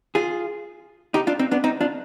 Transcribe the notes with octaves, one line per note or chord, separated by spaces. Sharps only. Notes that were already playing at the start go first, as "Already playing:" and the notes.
F4 G#4
D#4 G4
D4 F4
C4 D#4
B3 D4
C4 D#4
D4 F4